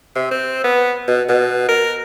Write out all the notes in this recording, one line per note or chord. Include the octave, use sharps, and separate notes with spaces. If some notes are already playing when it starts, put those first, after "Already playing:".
C3
C4
B3
B2
B2
A#4